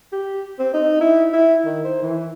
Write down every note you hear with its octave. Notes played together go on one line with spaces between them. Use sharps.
G4
C4
D#4
E4
E4
D#3
C5
E3